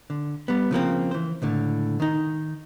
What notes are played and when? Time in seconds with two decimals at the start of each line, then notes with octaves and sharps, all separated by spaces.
0.10 D3
0.48 G3 B3
0.71 C#3 F3 A#3 C4
1.11 E3 C5
1.42 C#2 A2 D3
2.00 D#3 D#4